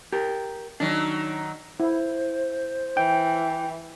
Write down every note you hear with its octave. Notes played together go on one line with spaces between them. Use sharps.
G4 A#4
D#3 F#3 D4
E4 C5
E3 G5